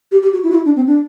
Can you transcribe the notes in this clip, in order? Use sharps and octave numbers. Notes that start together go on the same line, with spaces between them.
G4
G4
F#4
E4
F#4
E4
D4
C4
D4